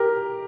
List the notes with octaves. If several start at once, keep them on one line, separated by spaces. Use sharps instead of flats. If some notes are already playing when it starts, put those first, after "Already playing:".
Already playing: G4 A#4